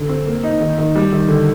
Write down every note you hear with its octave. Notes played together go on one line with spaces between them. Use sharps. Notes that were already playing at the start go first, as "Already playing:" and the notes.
Already playing: D3
C4
A#3
D#4
D#3
D#3
G3
D#3
D3